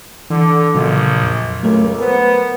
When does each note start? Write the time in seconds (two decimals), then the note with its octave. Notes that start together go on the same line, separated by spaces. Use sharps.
0.30 D3 E3
0.74 A#1 A#2 C#3 F#3
1.23 F2
1.63 C#2 F#3 A3 A#4
1.99 B3 A#4 C5